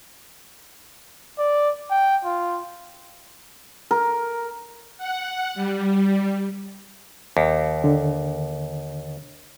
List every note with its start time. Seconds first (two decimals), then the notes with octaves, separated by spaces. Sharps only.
1.39 D5
1.90 G5
2.25 F4
3.91 A#4
4.98 F#5
5.54 G3
7.37 D#2
7.84 D3